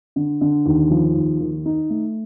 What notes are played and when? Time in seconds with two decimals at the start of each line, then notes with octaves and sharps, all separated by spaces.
0.16 D3
0.41 D3
0.66 D#2
0.90 F3
1.15 D#2
1.40 D#3
1.65 D#4
1.90 A3